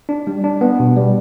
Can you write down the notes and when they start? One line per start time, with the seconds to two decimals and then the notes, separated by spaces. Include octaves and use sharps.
0.09 D4
0.27 G3
0.44 D4
0.61 B3
0.80 B2
0.97 G3